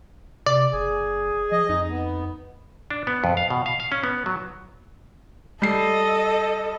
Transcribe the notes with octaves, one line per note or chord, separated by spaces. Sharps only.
C3 D5
F#1 G#4
F3 D#5
F2 D#4
B3
D4
B3
F2
F5
B2
F5
F5
C#4
B3
F#3
G3 A4 D#5 C7